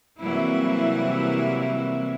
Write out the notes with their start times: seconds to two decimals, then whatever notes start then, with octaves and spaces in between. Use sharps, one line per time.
0.20 C3 E3 F#3 G3 A#3 E4